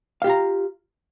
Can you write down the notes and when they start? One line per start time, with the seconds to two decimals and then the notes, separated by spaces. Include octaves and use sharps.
0.22 F5
0.24 G4
0.27 F4
0.30 A#5